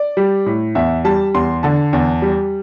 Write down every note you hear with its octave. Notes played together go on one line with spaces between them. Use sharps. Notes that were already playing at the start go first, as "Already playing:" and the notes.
Already playing: D5
G3
A2
E2 E5
G3 A5
E2 C6
D3 A5
E2
G3